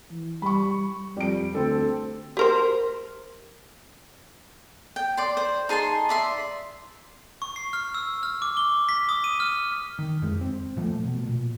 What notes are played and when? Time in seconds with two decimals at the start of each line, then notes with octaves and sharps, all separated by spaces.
0.11 E3
0.42 G3 B5 C#6
1.17 F2 G3 D7
1.55 D2 C4 A4
2.37 G4 A#4 C5
4.96 G5
5.17 D5 C6
5.37 C5
5.69 D#4 G#4 A5 C6
6.09 D5 E5 C6
7.42 C#6
7.56 C7
7.73 F6
7.95 E6
8.23 F6
8.42 D6
8.57 G7
8.89 B6
9.09 D#6
9.24 D#7
9.40 F6
9.99 D#3
10.22 F2 G#3
10.41 C4
10.76 A#2 F3 G#3 A3
11.04 B2
11.26 A#2